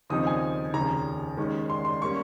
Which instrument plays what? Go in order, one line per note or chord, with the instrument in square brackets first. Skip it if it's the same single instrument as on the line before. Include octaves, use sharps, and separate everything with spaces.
[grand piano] D#2 C#3 F3 C4 D#4 D#6
G#5
F1 D#2 C#3 A#5
D#2 D#3 G#3 C#4
C6
C6
G3 A#3 C#4 C#6